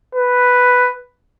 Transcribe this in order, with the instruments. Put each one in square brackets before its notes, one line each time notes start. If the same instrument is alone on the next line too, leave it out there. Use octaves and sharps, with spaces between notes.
[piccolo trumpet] B4